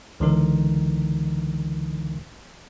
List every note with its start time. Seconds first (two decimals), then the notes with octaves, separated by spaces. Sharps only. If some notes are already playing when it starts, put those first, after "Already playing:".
0.20 C#2 D3 E3 G#3 D#4 A#4